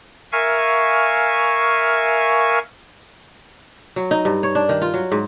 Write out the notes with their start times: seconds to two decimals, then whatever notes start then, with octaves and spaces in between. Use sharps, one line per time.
0.32 A#4 E5 F5 G#5 C#6
3.96 F#3
4.11 D#4
4.25 G2
4.43 C#5
4.55 D4
4.69 D#3
4.82 F4
4.94 F#3
5.12 G#2